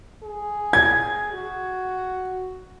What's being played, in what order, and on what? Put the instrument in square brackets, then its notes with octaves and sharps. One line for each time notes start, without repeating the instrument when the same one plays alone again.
[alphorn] G#4
[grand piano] G#6
[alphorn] F#4